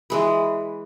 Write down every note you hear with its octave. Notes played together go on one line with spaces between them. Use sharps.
E3 G#3 B4